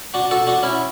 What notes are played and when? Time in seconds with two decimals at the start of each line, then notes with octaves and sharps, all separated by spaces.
0.14 D4 F#4
0.31 F#4 A4
0.47 D4 F#4
0.63 C#4 E4